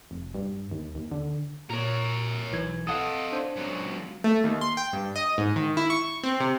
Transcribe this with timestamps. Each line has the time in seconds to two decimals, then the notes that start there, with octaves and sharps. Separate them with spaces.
0.11 F1
0.35 G2
0.71 D#2
0.95 D#2
1.11 D3
1.70 A#2 A#4 C#5
2.51 B1 E3 G#6
2.87 A4 D#5 F5 F#5 D#6
3.32 D4 C5
3.56 C#2 F#3
4.24 A3
4.44 D#2
4.61 C6
4.77 G5
4.93 G2
5.16 D#5
5.38 G#2
5.56 D#3
5.77 E4
5.90 C#6
6.23 C4
6.40 C3